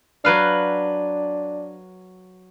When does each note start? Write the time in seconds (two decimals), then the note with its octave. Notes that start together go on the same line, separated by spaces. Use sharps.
0.25 F#3 D4 B4 F5